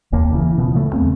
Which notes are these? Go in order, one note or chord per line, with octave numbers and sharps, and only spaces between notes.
F1 D#2 A#3
C#3 E3
B2 F3
D2 C#3 A3
E2 A3 B3 C4